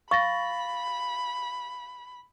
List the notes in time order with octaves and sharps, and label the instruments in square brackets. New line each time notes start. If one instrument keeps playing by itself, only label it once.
[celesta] F5 A6 A#6 [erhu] B5 [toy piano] C#6